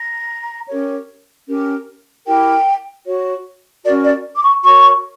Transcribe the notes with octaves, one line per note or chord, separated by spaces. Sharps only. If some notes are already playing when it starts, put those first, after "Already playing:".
Already playing: A#5
C#4 G4 A#4 C#5
C#4 G4 A#4
E4 G4 A#4 G5
F#4 C#5
C#4 F#4 A#4 D5
D5
D6
C#6
F#4 A#4 C#5 C#6